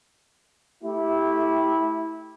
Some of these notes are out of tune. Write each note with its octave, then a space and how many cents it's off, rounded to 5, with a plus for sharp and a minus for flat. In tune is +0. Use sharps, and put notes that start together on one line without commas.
A3 +0 E4 -15 G4 +0